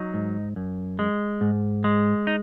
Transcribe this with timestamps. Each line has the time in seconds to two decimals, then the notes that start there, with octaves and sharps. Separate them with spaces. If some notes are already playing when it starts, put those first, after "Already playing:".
Already playing: F#3 D#4
0.14 G#2
0.56 F#2
0.99 G#3
1.41 G#2
1.84 G#3
2.27 D#4